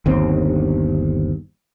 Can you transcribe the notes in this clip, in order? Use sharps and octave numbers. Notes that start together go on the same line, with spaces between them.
G1 D#2 C4